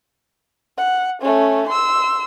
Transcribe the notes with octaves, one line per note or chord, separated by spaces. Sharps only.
F#5
A3 C#4
C6 E6